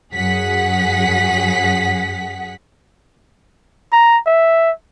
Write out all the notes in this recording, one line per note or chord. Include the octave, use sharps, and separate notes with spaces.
F#2 F#3 G#4 F#5 B6
A#5
E5